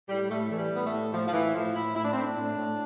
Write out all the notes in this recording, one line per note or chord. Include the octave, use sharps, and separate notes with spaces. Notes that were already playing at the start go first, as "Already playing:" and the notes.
A2 G3
A2 A3
E3 A3
G3
A2 B3
A3
A2
A2 F3
F3
A2 E3
A2 F3
A2 E4
A2 E4
D4
A2 C4
D4
A2
A2